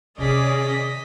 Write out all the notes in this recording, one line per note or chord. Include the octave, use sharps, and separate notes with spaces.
C3 D#3 C#4 G#4 D5 D#5 B6